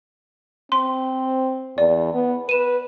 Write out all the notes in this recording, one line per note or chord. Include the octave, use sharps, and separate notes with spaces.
C4 C6
E2 D5
B3
B4 D#7 E7